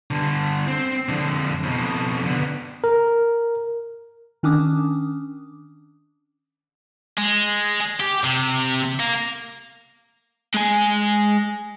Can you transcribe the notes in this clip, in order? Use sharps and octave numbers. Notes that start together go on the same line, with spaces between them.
G2 D3
C4
F2 D3
F2 B2
D3 B3
A#4
D#3 C#4 D4 D6 D#6
G#3
G4
C3
A#3
G#3 G#5